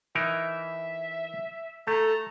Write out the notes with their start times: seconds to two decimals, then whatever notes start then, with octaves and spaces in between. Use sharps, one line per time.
0.15 E3 D#4 A#4 E5
1.87 A3 A4 A#5